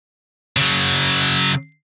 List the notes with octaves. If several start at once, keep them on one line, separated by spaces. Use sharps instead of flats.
C#3 F#3